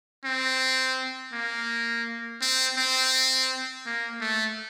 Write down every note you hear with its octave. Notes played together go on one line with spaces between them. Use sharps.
C4
A#3
C4
C4
A#3
A3